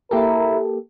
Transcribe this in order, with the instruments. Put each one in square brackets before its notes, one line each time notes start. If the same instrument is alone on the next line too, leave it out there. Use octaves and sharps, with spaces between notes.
[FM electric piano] A#3 G4 A4 [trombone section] E4 A#4